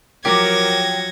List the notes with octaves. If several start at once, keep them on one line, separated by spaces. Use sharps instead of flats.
F3 F#3 G4 A#4 C#5 G#6 A#6